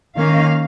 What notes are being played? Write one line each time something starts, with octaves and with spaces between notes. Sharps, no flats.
D#3 A#3 C#4 F5